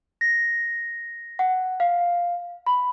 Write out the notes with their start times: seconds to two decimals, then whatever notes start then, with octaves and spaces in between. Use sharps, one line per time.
0.21 A#6
1.39 F#5
1.80 F5
2.66 B5